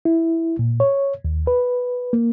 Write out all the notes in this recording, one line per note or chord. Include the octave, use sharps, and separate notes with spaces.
E4
A#2
C#5
D#2
B4
A#3